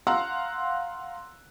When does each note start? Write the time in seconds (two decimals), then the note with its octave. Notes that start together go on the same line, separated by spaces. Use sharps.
0.07 F5 F#5 A#5 C6 E6 F#6